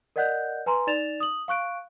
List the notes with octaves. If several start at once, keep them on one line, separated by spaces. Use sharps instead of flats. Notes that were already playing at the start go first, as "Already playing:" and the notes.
A#4 D5 D#5 F#5 F#6 G6
B4 G#5 A#5 C6
D#4 D5 A6 E7 F7
D#6 F#7
F5 C#6 F#6 D7